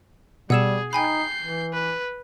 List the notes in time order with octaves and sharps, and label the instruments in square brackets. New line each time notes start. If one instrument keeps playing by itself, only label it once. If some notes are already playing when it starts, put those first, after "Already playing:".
[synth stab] B2 [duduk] G3 [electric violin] G#4 [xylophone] F#5 E6 E7
[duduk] D#4 [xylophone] G5 G#5 B5 [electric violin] G6 C7
[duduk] E3
[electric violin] B4